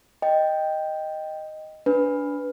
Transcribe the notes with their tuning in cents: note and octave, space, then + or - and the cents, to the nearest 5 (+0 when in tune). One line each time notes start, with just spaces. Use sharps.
D#5 +0 G5 +0
D4 -20 B4 +0